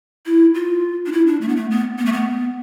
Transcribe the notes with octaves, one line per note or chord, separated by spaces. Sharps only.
E4
F4
D4
E4
D4
A3
B3
A3
B3
B3
A3
B3